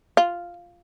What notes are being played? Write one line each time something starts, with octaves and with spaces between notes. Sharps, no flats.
F4